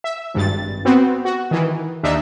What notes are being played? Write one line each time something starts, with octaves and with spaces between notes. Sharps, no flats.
E5
G#1 G2 A6
B3 C4 F#4
F#4
D#3 E3
D#2 D4 D#4 E5